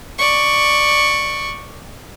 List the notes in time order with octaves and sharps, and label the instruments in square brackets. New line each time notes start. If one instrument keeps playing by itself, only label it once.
[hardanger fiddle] D5 C#6